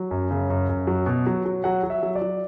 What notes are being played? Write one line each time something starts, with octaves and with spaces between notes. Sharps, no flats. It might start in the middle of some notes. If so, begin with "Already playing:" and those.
Already playing: F#3
F#2
C#3
F#2
F#2
F#3
B2
F#3
F#3
F#3 F#5
F#3
E5
F#3
D5
F#3